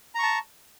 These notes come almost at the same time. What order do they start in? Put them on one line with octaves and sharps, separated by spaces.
A#5 C#6 A5